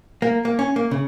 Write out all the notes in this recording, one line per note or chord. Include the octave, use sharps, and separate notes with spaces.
A#3
A#3
C#4
A#3
C#3